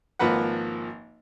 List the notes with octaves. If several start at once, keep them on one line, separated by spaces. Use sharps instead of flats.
G#1 F3 A#3 B4 F#5